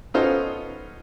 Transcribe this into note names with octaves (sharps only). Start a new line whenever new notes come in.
B3 C#4 D#4 F4 A4 C5